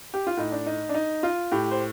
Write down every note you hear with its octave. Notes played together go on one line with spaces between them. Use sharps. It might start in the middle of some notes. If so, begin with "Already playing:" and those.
G4
F4
A2 D#4
D4
D#4
D4
D#4
F4
A2 G4
C5